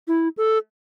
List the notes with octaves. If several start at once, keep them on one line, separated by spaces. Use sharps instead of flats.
E4
A4